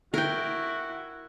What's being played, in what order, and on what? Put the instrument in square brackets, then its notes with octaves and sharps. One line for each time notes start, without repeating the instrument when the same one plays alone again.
[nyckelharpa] E4 [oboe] F#4 [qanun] A#4 G5